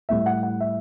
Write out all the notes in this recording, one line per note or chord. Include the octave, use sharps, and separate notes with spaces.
A2 G3 E5
F#5
F#5
E5